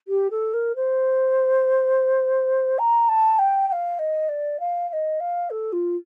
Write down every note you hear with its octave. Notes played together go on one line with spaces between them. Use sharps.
G4
A4
A#4
C5
A#5
A5
G5
G5
F5
D#5
D5
F5
F5
D#5
F5
A4
F4